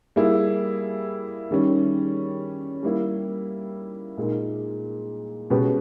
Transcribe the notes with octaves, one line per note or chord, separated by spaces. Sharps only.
G3 A#3 E4 G#4
D#3 G3 C#4
G3 A#3 E4
A#2 G#3 D#4 A#4
B2 G#3 C#4 G4 B4